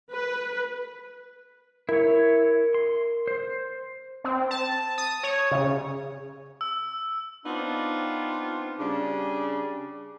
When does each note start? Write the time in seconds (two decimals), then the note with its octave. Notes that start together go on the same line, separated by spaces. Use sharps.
0.13 B4
1.89 E4 A#4 C#5
2.74 C6
3.27 C5
4.24 C4
4.51 A5
4.98 D#6
5.23 C#5
5.51 C#3
6.61 E6
7.46 B3 C4 D4 D#4 F4
8.79 C#3 G3 D4